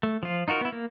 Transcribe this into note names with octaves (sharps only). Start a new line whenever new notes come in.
A3
F3 F4
D#4 F4 F#4 A#4
B3 E4
A#3